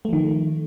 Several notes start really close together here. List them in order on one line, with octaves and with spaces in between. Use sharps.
A3 F3 D#3